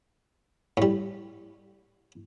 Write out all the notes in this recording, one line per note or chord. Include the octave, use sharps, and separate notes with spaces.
A2 G3